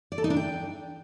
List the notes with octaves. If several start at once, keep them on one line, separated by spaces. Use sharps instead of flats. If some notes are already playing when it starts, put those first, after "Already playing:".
D5
A4
D#4
D4
G5